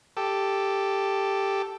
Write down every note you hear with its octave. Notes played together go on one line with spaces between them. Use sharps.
G4 A4